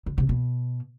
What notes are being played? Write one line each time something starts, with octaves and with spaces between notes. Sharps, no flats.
D3
C3
B2